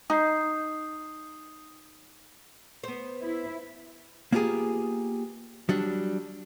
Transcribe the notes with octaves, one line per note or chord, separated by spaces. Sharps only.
D#4 D#6 G6 C7
B3 C5
E4
A#3 B3 F4 G4 G#4
F#3 G3 D4